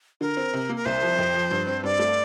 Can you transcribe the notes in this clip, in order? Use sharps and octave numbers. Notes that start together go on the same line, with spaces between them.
D3 A#4
C4
C3
A#3
A#4
C2 C5
F3
F2
F3
G2
C4
G2 D5
A3